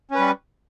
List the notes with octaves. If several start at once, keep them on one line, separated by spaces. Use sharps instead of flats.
G3 C#4 B4